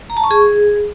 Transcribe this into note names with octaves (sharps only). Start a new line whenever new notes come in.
A#5
A5
C#6
G#4